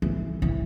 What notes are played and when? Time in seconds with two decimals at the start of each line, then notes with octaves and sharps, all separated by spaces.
0.02 E3
0.42 E3